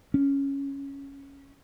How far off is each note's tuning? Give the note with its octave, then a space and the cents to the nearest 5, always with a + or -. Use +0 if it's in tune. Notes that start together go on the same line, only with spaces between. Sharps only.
C#4 +0